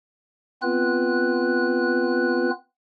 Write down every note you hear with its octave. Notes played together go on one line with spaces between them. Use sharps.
B3 C4 F4 B4 F#6